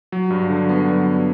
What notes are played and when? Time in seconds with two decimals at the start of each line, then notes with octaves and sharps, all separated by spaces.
0.12 F#3
0.30 G2
0.50 D3
0.69 B3
0.88 F#3
1.06 G2